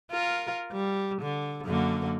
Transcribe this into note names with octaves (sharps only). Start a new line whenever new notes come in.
F4 A#4
G3
D3
F#2 D3 A#3